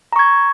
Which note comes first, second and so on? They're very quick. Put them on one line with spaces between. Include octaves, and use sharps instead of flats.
A#5 C#6 G#6